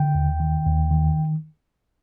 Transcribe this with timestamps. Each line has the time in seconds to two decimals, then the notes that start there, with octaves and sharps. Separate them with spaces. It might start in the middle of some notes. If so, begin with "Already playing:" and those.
Already playing: D3 G5
0.15 D#2
0.40 D#3
0.65 D#2
0.91 D#3